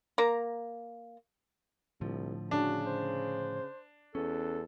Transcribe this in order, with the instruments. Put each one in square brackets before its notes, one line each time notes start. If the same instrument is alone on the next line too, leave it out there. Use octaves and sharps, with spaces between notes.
[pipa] A#3 A#5
[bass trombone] C2 [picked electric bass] A2 D3 F3
[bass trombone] C#3 [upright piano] D4 [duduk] F#4
[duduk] C5
[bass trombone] E2 [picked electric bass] C#4 [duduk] A4